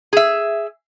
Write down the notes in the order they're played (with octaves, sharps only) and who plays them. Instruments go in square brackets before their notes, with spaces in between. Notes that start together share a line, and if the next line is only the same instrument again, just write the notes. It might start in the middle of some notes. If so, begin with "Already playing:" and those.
[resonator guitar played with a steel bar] G#4 E5